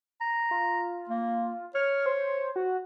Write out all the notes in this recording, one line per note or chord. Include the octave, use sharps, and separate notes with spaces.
A#5
F4
A#3
C#5 F6
C5
F#4